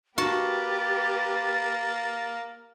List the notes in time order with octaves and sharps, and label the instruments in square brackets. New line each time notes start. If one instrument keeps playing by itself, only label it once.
[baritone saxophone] A#3 [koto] F#4 A5 [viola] G4 B4 [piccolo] A6